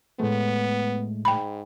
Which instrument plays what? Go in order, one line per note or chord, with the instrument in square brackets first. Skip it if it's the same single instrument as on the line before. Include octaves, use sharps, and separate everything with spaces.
[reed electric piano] A2 G#3 A3 [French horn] B3
[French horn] G#2 [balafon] G5 B5